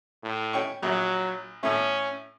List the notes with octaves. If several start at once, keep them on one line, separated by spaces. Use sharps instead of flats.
A2
C#4 G5 C#6
A#1 F#3
A2 A3 C#4